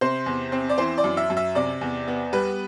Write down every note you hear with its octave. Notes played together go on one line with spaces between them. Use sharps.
C3 C5
E2
C4
D5
E3 C5
D5
F#2
E5
F#2
E5
C3 D5
E2
B3
G3 B4